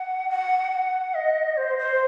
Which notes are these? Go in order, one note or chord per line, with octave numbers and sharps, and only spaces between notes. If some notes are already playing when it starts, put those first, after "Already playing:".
Already playing: F#5
F#5
F#5
D#5
C5
C5